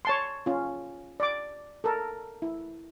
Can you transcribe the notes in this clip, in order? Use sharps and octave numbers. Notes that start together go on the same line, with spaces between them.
C#5 A5 C6
C#4 F4
D5 D6
A4 A#4
E4